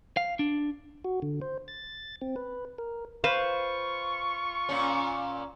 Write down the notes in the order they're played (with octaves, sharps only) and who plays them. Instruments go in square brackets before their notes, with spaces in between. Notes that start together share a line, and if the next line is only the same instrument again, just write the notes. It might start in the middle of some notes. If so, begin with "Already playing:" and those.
[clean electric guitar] F5
D4
[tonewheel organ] F#4
D3
C5
A6
C4
B4
A#4
[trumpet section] F4 C#6 [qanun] B4 C5 F5
[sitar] A#2 C#4